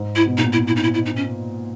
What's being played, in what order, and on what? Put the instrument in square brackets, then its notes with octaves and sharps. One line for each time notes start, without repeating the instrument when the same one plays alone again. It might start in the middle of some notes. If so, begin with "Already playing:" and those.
Already playing: [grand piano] G#2
[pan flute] E4
[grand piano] B2
[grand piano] A#2 [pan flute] D#4
[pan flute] E4
E4
D#4
E4
E4
D#4
C#4